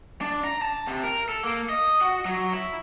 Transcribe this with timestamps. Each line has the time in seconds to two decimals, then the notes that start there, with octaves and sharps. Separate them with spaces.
0.21 D4
0.44 A#5
0.62 A5
0.87 C3
1.04 A#4
1.29 A4
1.44 A#3
1.69 D#5
2.01 F#4
2.25 F#3
2.53 E4